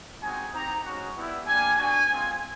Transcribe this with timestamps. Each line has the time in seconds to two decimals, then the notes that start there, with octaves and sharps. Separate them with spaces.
0.21 G#3 C4 D#4 F#4 G#5
0.53 C4 D#4 G4 A#5
0.84 G#3 C#4 F#4
1.16 G3 B3 E4
1.47 G3 A#3 D4 G4 G#5
1.78 B3 D4 F#4 G#5
2.10 G#3 C4 F4